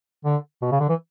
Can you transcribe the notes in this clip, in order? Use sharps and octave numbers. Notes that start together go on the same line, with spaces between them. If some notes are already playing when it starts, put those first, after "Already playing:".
D3
B2
C#3
D3
E3